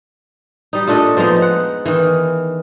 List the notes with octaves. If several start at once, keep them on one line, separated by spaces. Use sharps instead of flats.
G3 D#4
A#2 A3 D4 D#5
F3 G#3 B3 D#4
F#5
D#3 E3